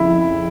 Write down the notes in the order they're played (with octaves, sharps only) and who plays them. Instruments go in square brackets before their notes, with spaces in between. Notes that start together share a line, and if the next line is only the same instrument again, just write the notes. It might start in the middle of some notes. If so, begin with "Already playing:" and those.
Already playing: [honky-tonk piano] F2 C#3 [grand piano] E4